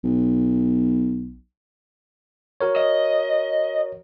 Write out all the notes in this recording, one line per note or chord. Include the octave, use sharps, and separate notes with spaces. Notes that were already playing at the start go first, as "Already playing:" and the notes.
B1
F#4 A#4 C#5
D#5